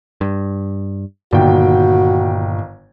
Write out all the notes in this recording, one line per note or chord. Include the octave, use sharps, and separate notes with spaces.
G2
G1 A#2 D#3 F#4 G5